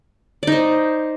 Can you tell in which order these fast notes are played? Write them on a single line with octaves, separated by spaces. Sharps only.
D5 D#4 C5